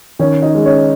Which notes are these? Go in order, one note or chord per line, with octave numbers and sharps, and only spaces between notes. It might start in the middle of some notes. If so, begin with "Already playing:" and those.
D#3 C#4 C#5
D#4 D#5
G#3
C#4 C#5